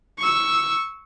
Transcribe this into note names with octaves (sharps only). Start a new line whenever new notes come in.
C#6 E6